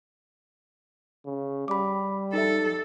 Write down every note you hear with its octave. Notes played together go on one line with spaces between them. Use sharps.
C#3
G3 B5 D6
D#4 A4 E5